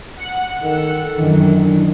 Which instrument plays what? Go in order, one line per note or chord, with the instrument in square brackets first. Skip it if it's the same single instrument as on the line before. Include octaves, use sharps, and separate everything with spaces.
[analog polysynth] F#5
[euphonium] D#3 [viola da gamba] A4
[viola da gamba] F#2 E3 [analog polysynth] D#3 [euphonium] D4